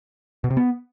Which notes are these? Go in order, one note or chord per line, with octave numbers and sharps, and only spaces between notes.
B2
C3
B3